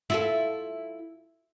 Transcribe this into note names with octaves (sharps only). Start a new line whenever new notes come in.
E4 F4 A4